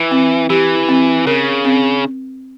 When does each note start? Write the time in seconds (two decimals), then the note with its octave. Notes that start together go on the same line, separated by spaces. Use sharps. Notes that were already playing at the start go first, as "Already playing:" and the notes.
Already playing: E3
0.11 C4
0.50 E3 G4
0.89 C4
1.27 C#3 A#4
1.65 C4